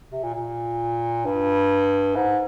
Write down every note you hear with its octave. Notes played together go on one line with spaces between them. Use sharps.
C3
A#2
A#2
G2
G#2